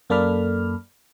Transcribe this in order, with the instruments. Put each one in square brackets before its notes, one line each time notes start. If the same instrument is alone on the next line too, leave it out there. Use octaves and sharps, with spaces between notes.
[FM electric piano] F#2 A#3 A4 D5 B5 F6